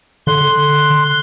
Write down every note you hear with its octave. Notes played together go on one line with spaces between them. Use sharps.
D3 C6 F#6